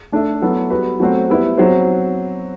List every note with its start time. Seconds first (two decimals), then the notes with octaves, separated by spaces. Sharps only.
0.12 A3 D4 A4 E5
0.42 F#3 B3 E4 A4
0.70 G3 B3 F#4 B4
1.00 F#3 A3 C4 F#4 C5
1.29 G3 B3 E4 B4
1.58 F#3 C4 F#4 C5